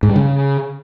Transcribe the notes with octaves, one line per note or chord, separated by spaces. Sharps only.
G#2
G3
C#3